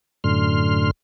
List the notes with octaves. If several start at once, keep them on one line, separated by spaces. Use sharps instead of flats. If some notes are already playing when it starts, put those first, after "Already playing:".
F#2 A2 D3 C6 F6